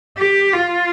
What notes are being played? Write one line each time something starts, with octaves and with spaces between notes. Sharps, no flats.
G4
F4